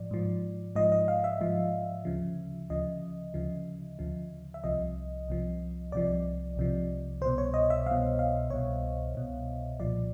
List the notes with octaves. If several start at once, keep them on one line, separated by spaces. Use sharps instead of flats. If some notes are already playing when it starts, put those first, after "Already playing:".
Already playing: G#2 F3 D5
G#2 F3
G#2 F3 D#5
D#5
F5
E5
G#2 F3
D2 C#3 F3
D2 C#3 F3 D#5
D2 C#3 F3
D2 C#3 F3
E5
C2 C3 F3 D#5
C2 C3 F3
C2 C3 F3 D5
C2 C3 F3
C2 B2 C5
C#5
D#5
E5
C2 B2 F5
F5
C2 B2 C#5
C2 B2
C2 A#2 F3 D5